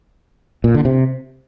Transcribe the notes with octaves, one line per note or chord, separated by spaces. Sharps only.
A#2
D3
C3